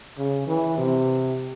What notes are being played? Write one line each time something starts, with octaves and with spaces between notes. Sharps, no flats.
C#3
E3
C3